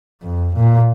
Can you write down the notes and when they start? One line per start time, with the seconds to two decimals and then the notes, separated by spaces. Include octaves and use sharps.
0.22 F2
0.56 A#2